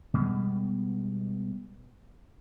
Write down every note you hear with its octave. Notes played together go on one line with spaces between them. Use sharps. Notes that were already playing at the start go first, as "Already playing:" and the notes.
B2 G3 G#3 B3